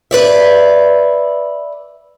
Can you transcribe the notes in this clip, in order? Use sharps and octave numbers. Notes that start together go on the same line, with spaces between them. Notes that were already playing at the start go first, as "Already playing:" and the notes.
B4 D5 E5